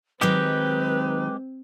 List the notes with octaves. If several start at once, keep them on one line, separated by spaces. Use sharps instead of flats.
D#3 F#3 G#3 C4 D#4 G4 B4